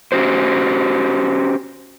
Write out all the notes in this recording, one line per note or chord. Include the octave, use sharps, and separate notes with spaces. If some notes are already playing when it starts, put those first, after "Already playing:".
C#4 F#4 G4 C5